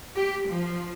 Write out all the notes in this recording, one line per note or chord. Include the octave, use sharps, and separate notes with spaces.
G4
F3